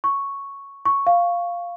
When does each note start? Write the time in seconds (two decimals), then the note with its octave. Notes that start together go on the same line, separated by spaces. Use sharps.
0.04 C#6
0.85 C#6
1.07 F5